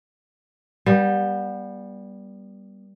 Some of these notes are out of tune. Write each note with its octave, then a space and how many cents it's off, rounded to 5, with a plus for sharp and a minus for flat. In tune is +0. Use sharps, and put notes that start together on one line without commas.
G3 +0 B3 -35